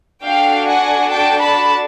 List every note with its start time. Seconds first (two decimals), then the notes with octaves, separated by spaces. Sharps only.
0.23 D4 F#4 A4 F5 G5
0.68 F#5 G#5
1.12 G5 A5
1.42 A5 B5